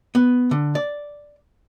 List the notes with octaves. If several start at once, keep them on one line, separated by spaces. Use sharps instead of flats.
B3
D3
D5